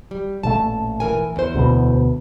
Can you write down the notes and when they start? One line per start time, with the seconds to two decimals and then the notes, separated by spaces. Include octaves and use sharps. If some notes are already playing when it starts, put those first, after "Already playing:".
0.11 G3
0.43 A1 A#2 A3 A5
1.00 E3 A#4 G#5
1.36 E2 C5
1.55 D2 B2 B3